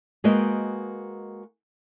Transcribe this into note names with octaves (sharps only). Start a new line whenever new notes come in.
G#3 A#3 F#4 B4 D#5 G5